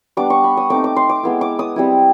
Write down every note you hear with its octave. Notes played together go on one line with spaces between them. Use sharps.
G3 B3 D4 D6
C#6
B5
D#6
A3 C4 D#4 D6
D6
C6
D6
G#3 B3 E4
D6
D#6
G3 C4 E4